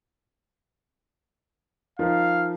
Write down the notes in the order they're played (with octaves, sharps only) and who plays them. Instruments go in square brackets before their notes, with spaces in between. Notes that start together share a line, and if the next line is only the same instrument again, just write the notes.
[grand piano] F3 D#4 A#4 [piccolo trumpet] F5